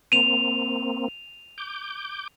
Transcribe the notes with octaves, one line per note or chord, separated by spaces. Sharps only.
A#3 C4 D#7 F7
D6 G6